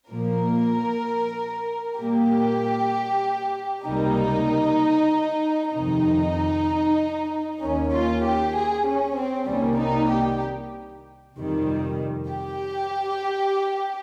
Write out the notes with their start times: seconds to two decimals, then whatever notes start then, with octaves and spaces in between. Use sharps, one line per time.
0.11 A#2 F3 A#3 A#4
1.99 A#2 G3 A#3 G4
3.86 C#2 C3 G3 A#3 D#4
5.74 F2 C3 D#3 D#4
7.61 D#2 D#3 A#3 C#4
7.92 F4
8.23 G4
8.55 G#4
8.87 C#4
9.17 C4
9.49 C2 C3 D#3 G3 A#3 C#4
9.80 D#4
10.11 G4
11.36 F2 C3 D#3 G3
12.30 G4